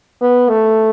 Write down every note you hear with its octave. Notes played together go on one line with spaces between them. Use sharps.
B3
A3